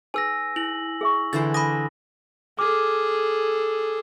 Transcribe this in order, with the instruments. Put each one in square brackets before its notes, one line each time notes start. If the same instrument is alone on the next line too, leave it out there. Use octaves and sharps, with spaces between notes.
[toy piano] D#4 G#4 B4 [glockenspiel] G#5 E6 A#6
[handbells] E4 [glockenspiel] F#7
[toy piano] G#4 E5 C#6
[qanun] D3 E3 C5 [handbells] A6
[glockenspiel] G#5 A#6 [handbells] B5 D6 D#6
[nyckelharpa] G#4 A4 [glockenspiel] D6 F6